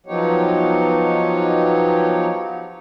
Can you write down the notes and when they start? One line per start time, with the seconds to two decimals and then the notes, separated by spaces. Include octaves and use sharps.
0.06 F3 F#3 B3 D#4 G4 C#5